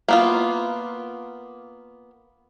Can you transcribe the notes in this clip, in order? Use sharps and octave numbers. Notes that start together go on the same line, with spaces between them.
A#3 B3 F4